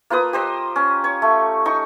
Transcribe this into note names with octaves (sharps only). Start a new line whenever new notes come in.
A#3 F4 B4 D#6
G4 C5 D#5
C#4
C#5
A3
D#4 C#6